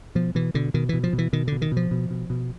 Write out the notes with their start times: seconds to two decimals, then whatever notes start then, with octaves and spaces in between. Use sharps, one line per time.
0.15 B2 F3
0.35 B2 E3
0.54 B2 D3
0.74 B2 D#3
0.89 B2 E3
1.03 F3
1.13 B2
1.18 E3
1.33 B2 D#3
1.47 B2 D3
1.62 D#3
1.72 B2 F3
1.91 B2
2.11 B2
2.30 B2